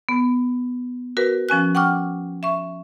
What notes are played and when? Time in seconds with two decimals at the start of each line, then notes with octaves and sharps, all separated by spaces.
0.09 B3
1.17 F#4 A#4 B4
1.49 F3 C#4 G#5 F#6
1.75 F#5 G5 C#6 D6 F6
2.43 E5 C#6